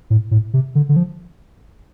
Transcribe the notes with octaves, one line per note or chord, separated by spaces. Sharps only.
A2
A2
C3
D3
D3
F3